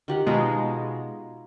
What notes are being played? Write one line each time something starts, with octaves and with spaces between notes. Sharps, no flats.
D#3 G4 F#5
B2 G#3 D#4 F4